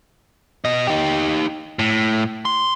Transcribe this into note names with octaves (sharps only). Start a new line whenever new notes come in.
B2 D#5
D#4 G4
A2
C6